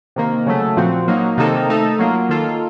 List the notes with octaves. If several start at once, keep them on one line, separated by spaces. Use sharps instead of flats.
C3 D#3 A#3
C#3 F#3 A3
A#2 F3 C4 F#4
F#3 A#3 D#4
C3 D#3 A#3 D#4 A4
A3 D#4 A4
F#3 A#3 F4
D#3 A#3 F4 A4